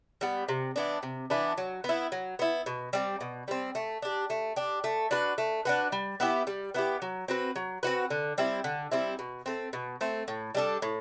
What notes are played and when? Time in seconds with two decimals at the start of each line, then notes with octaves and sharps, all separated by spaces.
0.21 G3 B3
0.49 C3
0.76 E3 B3 D4
1.03 C3
1.30 E3 B3 D4
1.58 F#3
1.84 B3 E4
2.12 F#3
2.39 B3 E4
2.66 B2
2.93 G3 C4
3.21 B2
3.48 G3 C4
3.75 A3
4.02 D4 G4
4.30 A3
4.56 D4 G4
4.84 A3
5.11 D4 F#4 B4
5.38 A3
5.65 D4 F#4 B4
5.92 G3
6.20 B3 E4 G4
6.47 G3
6.75 B3 E4 G4
7.02 F#3
7.28 C4 F#4 B4
7.56 F#3
7.83 C4 F#4 B4
8.10 D3
8.38 G3 C4 E4
8.64 D3
8.92 G3 C4 E4
9.19 B2
9.46 A3 C4
9.73 B2
10.01 A3 C4
10.28 A2
10.55 G3 D4 A4
10.82 A2